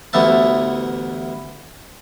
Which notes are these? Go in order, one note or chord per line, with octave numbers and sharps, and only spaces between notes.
A1 D2 E3 B3 E5 A5